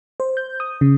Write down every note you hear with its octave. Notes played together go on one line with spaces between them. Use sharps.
C5
G6
D#6
C#3